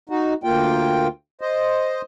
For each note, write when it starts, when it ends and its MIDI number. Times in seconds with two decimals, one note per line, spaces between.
0.10 0.34 63
0.10 0.34 66
0.44 1.07 38
0.44 1.07 58
0.44 1.07 65
0.44 1.07 79
1.41 2.02 72
1.41 2.02 75